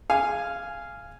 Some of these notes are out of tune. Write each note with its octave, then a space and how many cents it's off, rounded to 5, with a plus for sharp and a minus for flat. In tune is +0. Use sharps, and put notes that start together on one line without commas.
F5 -10 G#5 +0